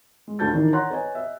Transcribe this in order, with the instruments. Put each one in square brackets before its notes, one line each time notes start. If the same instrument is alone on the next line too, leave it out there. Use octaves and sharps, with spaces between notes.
[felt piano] G#3
D2 A4 A5 G6 A6
D#3 E3 D4 D#4
C#5 F#5 A#5 C6 F#6
B4 C#5 D#5 G#5
D#5 E5